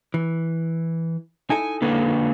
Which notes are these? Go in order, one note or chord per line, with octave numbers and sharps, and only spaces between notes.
E3
D#4 E4 A4 G#5
D3 A#3 B4